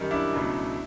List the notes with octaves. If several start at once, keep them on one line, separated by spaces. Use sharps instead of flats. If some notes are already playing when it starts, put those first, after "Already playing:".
Already playing: F#2 D#3 G3
D4 E4
C#2 B2 F#3 A3